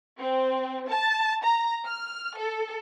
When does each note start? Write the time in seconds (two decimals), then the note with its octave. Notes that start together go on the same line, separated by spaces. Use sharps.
0.19 C4
0.88 A5
1.44 A#5
1.86 F6
2.36 A4